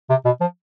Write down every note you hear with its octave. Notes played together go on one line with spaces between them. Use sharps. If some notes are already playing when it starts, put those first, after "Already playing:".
C3
B2
F3